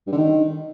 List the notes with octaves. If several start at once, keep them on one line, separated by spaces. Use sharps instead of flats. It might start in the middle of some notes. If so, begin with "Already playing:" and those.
G2
D3
D#3